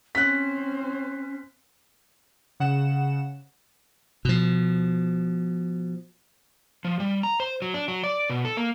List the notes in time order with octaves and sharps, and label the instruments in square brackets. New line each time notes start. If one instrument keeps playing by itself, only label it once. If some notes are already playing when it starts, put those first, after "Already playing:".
[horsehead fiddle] C4 C5 [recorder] C#4 [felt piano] F#6 B6
[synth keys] C#3 F#5 E7
[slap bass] B2 F3
[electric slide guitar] F3
G3
A#5
C5
F#3
D4
F#3
D5
B2
A4
A#3